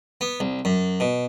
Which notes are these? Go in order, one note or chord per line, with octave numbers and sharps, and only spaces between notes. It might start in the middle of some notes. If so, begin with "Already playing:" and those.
B3
C2
F#2
B2